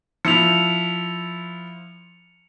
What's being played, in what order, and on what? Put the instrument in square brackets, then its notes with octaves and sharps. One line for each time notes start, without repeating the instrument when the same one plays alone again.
[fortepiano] F3 E4 [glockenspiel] C#7 F7